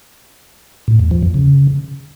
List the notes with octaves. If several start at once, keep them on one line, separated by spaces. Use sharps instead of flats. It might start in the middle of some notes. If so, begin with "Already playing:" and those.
A2
E2
F3
F2
C#3